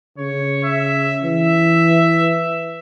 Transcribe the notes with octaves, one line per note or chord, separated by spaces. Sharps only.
C#3 C#5
E5
E3 E5